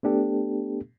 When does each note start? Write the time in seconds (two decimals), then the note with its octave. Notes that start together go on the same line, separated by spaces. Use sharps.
0.03 A3 B3 D4 G4 A4